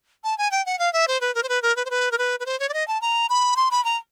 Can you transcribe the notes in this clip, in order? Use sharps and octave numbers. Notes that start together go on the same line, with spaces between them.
A5
G#5
G5
F#5
F5
E5
C5
B4
A#4
C5
B4
A#4
B4
C5
B4
A#4
B4
B4
C5
C#5
D5
D#5
A5
A#5
B5
C6
B5
A#5